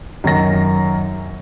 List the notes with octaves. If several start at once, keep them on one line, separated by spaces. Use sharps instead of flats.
F#2 D#3 A#6